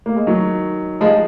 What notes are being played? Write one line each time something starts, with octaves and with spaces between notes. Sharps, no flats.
A#3
G#3
D#3 F#3
F3 G#3